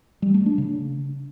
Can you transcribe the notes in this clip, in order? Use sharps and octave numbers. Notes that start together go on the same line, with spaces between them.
G3
A3
D4
C#3